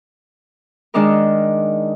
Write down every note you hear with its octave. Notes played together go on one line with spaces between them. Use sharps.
D#3 G#3 D4 D#4 A#4